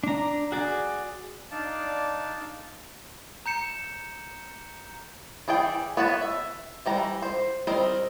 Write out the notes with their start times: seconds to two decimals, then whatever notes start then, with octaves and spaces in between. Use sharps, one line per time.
0.04 D4 A#5
0.52 F#4 G#4 D5
1.51 D4 D#4 D5 F5 A5
3.46 A#5 G6 C#7 E7
5.48 E3 G#4 D5 G5
5.97 B3 C#5 F#5 A5
6.21 E5
6.86 E3 G3 A#5
7.22 C5
7.67 G3 C4 A#4 D#5